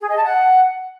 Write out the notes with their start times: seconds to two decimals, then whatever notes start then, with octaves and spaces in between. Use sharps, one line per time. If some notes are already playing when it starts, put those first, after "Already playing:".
0.01 G#4
0.09 D#5
0.16 A5
0.24 F#5